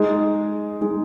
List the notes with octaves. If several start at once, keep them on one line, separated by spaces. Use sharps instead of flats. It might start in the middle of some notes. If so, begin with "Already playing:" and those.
Already playing: G#3 D#4 G#4
G#3 D#4 G#4